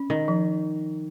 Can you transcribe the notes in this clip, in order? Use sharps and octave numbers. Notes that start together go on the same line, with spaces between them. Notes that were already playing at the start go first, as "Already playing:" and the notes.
Already playing: C#4
D#3
F3